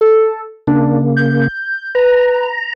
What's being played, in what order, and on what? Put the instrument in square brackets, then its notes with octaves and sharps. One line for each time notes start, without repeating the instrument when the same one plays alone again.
[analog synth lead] A4
[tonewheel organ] C#3 A#3 [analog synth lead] D4
[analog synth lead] G6
[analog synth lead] B4 [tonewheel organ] A#5